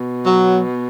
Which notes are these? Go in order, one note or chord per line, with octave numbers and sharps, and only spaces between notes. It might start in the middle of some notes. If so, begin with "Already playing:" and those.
Already playing: B2
F#3